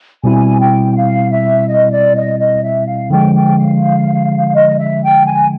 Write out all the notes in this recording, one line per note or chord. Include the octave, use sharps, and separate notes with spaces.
B2 G3 C4 E4 G#5
G5
F5
E5
D#5
D5
D#5
D#5
E5
F5
D3 F3 G#3 G5
G5
F5
D#5
E5
G5
G#5